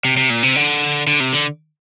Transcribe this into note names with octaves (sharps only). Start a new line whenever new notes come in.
C3
C3
A#2
C3
D3
D3
C3
D3